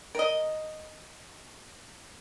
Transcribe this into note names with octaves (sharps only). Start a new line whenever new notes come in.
A#4 D#5